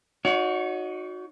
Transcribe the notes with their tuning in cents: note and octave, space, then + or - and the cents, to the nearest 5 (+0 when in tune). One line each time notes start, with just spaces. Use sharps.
D#4 +0 F#4 -20 C#5 +35